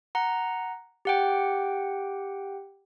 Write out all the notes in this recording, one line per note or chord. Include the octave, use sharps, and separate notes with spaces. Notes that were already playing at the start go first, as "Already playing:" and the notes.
F#5 A#5
G4 F#5 G5